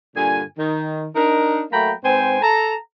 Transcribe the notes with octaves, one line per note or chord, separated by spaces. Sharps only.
G2 A#2 D3 G#5
D#3
D4 D#4 A#4
F#3 A3 A#3 G5 A#5 B5
G#2 C4 B4 C5 G5 G#5
A4 A5 A#5